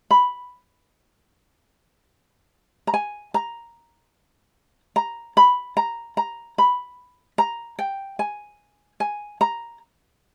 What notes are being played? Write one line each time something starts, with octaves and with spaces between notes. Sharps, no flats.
B5
A#5
G#5
A#5
A#5
B5
A#5
A#5
B5
A#5
G5
G#5
G#5
A#5